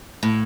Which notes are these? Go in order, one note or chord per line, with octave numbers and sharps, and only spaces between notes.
A2